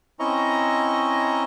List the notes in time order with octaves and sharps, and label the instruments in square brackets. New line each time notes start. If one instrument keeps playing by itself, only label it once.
[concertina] C4 C#4 E4 D#5 A#5 C#6